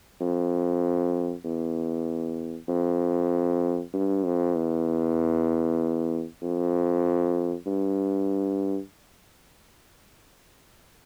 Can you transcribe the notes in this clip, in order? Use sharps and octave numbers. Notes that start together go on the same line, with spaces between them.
F2
E2
F2
G2
F2
E2
F2
G2